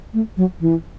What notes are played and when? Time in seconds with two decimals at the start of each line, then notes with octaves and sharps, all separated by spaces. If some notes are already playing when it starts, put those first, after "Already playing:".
0.13 A3
0.37 F#3
0.60 E3